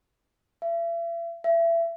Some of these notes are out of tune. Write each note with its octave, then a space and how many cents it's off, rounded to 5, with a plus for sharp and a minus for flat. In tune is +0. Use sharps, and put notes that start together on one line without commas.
E5 +40
E5 +30